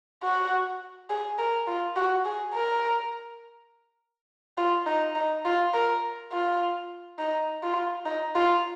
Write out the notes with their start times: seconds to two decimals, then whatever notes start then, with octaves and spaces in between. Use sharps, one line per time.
0.23 F#4
1.10 G#4
1.38 A#4
1.67 F4
1.96 F#4
2.25 G#4
2.54 A#4
4.58 F4
4.86 D#4
5.15 D#4
5.45 F4
5.74 A#4
6.32 F4
7.19 D#4
7.63 F4
8.05 D#4
8.35 F4